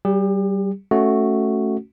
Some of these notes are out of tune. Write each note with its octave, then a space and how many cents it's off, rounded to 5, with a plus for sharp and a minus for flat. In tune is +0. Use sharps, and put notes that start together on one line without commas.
G3 -25 G4 +35
A3 +0 C#4 +0 F#4 +0